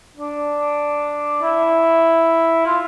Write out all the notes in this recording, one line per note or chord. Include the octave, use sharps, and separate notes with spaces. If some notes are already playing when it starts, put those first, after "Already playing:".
D4
E4
F4